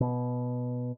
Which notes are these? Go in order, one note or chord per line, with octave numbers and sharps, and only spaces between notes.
B2